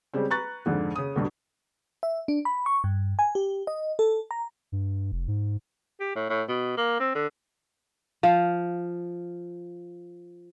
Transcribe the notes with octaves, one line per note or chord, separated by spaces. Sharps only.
C#3 G3 G#3 C4
B4 A#5 C#6 F#6 A6
F2 G#2 D3
C#3 D#6
D2 G2 B2
E5
D4
B5
C#6
G2
G#5
G4
D#5
A4
A#5
G2
F1
G#2
G4
A2
A2
B2
A#3
C4
D3
F3 F5